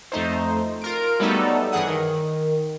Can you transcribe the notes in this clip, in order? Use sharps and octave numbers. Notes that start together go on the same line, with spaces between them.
F2 A3 D#4 C5
F4 A#4 D7
F#3 G3 A3 B3 D#4 A4
G2 E3 G#4 F#5 D#6
D#3